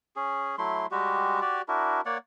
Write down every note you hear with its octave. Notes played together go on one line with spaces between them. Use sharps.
C#4 G#4
F#3 A3 E4 C6
G3 G#3 F#4 G4
F#4 G4 D5
D4 E4 F#4 A#4
A#3 C#5 D5 F#5